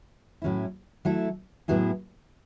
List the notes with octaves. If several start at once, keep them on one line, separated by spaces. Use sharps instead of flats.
A2 F#3 C#4 E4
F#3 A3 E4 A4
A2 F#3 B3 E4 G#4